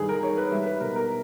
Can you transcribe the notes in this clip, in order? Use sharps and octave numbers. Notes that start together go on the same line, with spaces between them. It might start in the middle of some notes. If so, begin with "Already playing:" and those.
Already playing: G2 D#3 G#4
A#4
D#4 C#5
B4
G3 E5
B4
B2 A#4
A#4